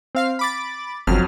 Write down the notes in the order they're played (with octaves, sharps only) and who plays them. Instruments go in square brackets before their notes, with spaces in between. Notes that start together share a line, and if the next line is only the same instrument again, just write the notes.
[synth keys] C4 F5 C7
B5 D6 A6
[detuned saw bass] G1 [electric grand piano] F2 F#3 [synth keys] F6